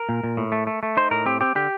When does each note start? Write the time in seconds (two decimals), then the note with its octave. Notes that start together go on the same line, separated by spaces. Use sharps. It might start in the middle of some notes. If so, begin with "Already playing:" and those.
Already playing: A#4
0.09 A#2
0.24 A#2
0.37 A2
0.52 A3
0.67 A3
0.83 A3
0.97 D#4 C5
1.11 A2 A#4
1.26 C4 G4
1.41 C4 G4
1.55 D3 G4